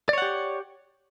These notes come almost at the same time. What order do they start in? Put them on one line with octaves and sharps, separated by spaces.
D5 C#5 F#5 G4